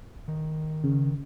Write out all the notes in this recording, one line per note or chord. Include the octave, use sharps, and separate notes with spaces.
D#3
C#3